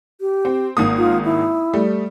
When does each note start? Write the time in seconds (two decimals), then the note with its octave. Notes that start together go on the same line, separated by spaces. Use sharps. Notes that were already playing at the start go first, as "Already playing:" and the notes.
0.21 G4
0.45 C4
0.77 G#1 A#3 D#6
0.98 F4
1.25 E4
1.74 G3 A3